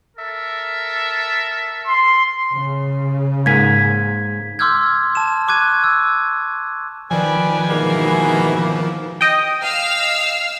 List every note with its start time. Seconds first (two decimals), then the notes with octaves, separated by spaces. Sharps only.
0.17 A4 A#4 E5
1.87 C6
2.54 C#3
3.46 G#2 A#3 G#5 G#6 B6
4.59 C6 D6 E6 F6 G6 G#6
5.15 A5 E7
5.48 C#6 D6 F#6 G#6 D#7
5.84 E6
7.11 D#3 F3 B4 D5 G5 G#5
7.70 G#2 B2 E3 A#3
9.21 D#5 G5
9.64 F5 E6 F6